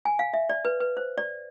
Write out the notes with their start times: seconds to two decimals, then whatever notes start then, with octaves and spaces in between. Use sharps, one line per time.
0.05 G#5
0.19 F5
0.34 E5
0.50 D5
0.65 B4
0.80 B4
0.97 C5
1.18 D5